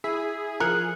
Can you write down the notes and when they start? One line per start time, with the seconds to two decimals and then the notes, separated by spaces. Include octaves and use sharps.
0.04 E4 G#4 E5 B6
0.60 F3 A#4 F#6 C#7